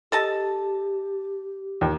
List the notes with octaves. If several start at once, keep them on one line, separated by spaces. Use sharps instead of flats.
G4 A4 D#5 A5
D#2 G5